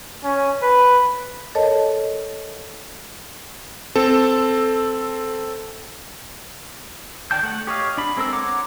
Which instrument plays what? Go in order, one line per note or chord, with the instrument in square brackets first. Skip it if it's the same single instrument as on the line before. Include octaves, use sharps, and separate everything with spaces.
[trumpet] C#4
B4
[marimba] A4 A#4 C#5 D#5 A5
[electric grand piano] C4 A4
[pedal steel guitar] D#3 D5 G5 A5 G6
A3 F#5
G4 C#5 D#5 F5
D4 B5
G#3 C4 A4 A#4 E6
C#5 F#5 A#5 C6 D6